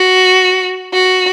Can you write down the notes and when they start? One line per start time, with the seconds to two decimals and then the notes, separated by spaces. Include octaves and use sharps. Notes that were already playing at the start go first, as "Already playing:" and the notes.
Already playing: F#4
0.93 F#4